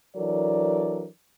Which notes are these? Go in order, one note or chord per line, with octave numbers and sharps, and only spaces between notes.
E3 F#3 D4 A4 A#4 D5